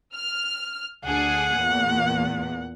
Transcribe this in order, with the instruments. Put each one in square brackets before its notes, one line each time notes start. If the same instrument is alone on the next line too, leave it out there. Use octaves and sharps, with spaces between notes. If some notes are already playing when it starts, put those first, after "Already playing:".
[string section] F6
[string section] D2 D4 G#4 [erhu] F#5
[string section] E2 A#2